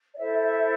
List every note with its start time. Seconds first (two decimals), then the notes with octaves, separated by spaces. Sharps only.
0.14 D5
0.17 E4 A4 C5 E5
0.41 E5